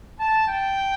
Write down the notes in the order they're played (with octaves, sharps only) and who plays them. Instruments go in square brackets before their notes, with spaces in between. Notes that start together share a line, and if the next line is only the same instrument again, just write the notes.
[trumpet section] A5
G5